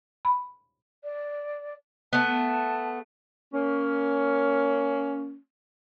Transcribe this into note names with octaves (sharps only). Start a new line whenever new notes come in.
B5
D5
A3 B3 A5
A#3 C#4